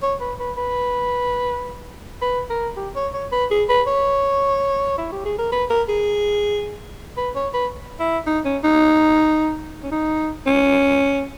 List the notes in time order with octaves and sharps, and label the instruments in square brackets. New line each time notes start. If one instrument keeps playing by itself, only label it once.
[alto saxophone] C#5
B4
B4
B4
B4
A#4
G4
C#5
C#5
B4
G#4
B4
C#5
E4
G4
G#4
A#4
B4
A#4
G#4
B4
C#5
B4
E4
D#4
C#4
D#4
C#4
D#4
C#4